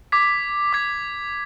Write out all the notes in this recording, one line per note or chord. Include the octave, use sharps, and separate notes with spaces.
D6 G#6 B6
D6 G#6 B6